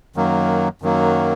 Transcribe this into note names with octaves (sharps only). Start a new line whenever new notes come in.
F#2 D#3 F#3 A#3
F#2 D#3 F#3 A#3